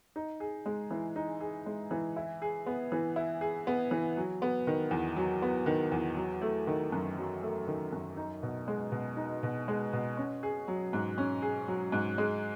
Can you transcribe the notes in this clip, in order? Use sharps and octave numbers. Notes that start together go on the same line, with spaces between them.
D#4
G#4
G#3
E3
D#4
G#4
G#3
E3
E4
G#4
B3
E3
E4
G#4
B3
E3
F#3
B3
D#3
E2
F#3
B3
D#3
E2
F#3
A3
D#3
F#2
F#3
A3
D#3
F#2
D#4
B2
G#3
B2
D#4
B2
G#3
B2
C#4
G#4
F#3
G#2
C#4
G#4
F#3
G#2
G#3